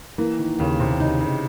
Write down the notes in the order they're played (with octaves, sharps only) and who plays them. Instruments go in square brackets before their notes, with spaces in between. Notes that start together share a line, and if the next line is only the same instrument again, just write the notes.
[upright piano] E3 [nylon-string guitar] A#3
[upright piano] D#3
[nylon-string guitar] D#2 [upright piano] C#3
[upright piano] C3
[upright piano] C#3 [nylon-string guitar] D#4
[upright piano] C#3